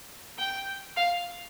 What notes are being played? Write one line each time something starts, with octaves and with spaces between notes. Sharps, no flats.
G5
F5